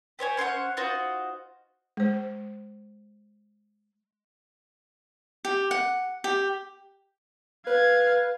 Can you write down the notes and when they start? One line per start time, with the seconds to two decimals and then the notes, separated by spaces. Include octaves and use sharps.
0.19 G4 C5 C#5 G#5
0.37 C#4 C5 C#5 F#5
0.77 D#4 F4 F#4 C5
1.97 G#3 C5
5.45 G4
5.71 F#5
6.24 G4
7.67 B4 F5 G#6